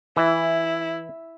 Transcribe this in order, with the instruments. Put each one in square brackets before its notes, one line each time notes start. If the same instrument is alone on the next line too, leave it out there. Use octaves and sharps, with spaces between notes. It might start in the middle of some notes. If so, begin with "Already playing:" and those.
[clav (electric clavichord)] E3 [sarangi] E4